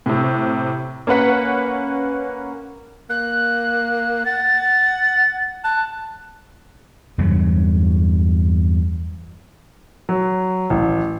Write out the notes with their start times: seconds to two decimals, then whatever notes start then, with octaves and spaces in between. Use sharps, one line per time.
0.06 A2 C3
1.07 A#3 C#4 B4 F#5 B6
3.10 A#3 F#6
4.25 F#5 A6
5.64 A5 F#6
7.18 E2 G2 C#3 F#3
10.09 F#3
10.70 A1